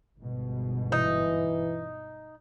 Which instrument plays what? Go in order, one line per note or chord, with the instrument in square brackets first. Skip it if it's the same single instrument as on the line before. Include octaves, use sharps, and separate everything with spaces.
[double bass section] G1 G#2 B2
[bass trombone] E3 [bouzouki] D#4